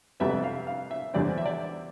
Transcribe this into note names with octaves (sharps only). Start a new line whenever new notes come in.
F2 C3 G3 B3 E5
F5
F5
E5
E2 D3 G3 C4 D5
E5
D5